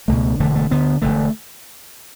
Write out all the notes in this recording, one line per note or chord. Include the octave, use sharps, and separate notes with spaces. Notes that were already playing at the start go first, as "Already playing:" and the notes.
C#2 B2 A3
E1 D2 D3 A3
A3
D2 D3 B3
E1 E2 D3 A3